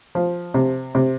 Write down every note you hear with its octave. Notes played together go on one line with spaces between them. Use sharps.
F3
C3
C3